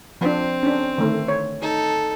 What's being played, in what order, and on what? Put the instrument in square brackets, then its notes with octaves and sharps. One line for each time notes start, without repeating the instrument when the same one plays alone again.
[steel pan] F3 D4 [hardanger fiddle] C4
[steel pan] C#4 D4
D3 D#3 A3
C#5
[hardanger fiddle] D#4 A4